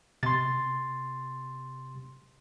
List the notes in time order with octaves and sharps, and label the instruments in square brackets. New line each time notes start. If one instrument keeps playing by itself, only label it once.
[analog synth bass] C3 [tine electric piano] C6 A6